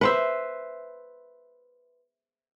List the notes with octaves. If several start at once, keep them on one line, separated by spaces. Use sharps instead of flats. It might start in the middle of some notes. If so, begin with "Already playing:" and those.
B4 C5 E5